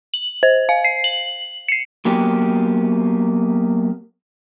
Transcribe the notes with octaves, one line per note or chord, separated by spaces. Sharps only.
F#7
C5
F5
C7
F#7
C7 C#7
F#3 A#3 B3 G4